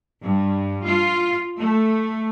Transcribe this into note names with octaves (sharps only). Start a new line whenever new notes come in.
G2
F4
A3